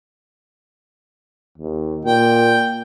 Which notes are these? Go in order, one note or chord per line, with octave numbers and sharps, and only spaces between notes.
D#2
A#2 G5